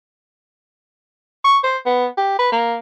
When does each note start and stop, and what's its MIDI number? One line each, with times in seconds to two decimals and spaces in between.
1.44 1.58 85
1.64 1.77 72
1.86 2.06 59
2.17 2.35 67
2.39 2.49 71
2.52 2.77 58